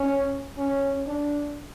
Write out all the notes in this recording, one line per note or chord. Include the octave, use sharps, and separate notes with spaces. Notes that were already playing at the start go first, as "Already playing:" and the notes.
Already playing: C#4
C#4
D4